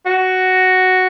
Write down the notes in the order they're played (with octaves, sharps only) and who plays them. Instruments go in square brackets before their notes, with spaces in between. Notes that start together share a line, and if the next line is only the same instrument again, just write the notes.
[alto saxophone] F#4